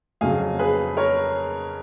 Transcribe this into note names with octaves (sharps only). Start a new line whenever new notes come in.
F2 C#3 F#3 F5 G#5
G#4 B4
A#4 C#5